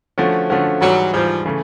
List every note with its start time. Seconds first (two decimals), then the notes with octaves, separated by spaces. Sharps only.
0.18 D3 F3 A3 C#4 F#4
0.50 D3 F3 A3 C#4 F#4
0.81 G#2 E3 F#3 G3
1.13 G#2 E3 F3 G3
1.45 C#3 E3 A3